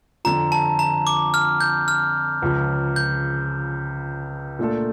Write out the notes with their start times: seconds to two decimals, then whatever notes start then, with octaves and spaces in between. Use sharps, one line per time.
0.25 F2 D3 F3 A#5
0.52 A5
0.79 A#5
1.07 D6
1.34 F6
1.60 G6
1.88 F6
2.42 C#2 C#3 F3
2.96 G6
4.59 A#2 A3 D4 F4 A4